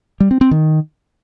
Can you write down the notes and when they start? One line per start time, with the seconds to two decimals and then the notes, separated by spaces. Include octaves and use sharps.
0.20 G3
0.31 C4
0.41 C4
0.51 D#3